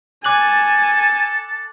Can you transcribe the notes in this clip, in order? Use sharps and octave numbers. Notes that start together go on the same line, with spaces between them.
A4 G#5 A5 D6 F#6 F#7